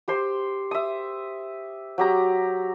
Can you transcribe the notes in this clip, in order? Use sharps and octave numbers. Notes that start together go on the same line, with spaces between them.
G4 C5 C6
E5 D#6
F#3 G4 A#5